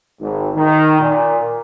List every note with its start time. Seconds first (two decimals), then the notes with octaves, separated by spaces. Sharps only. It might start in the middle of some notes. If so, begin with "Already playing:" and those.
0.21 G#1
0.55 D#3
1.00 A#2